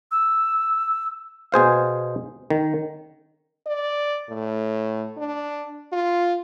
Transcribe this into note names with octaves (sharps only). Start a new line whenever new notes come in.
E6
B2 G#4 C5 F5
D#3
D5
A2
D4
F4